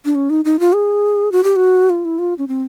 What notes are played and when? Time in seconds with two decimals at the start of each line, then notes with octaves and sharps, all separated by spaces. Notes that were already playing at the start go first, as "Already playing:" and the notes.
0.05 D4
0.15 C#4
0.30 D#4
0.45 D#4
0.60 F4
0.73 G#4
1.32 F#4
1.44 G4
1.56 F#4
1.90 F4
2.05 E4
2.19 F4
2.38 C#4
2.48 C4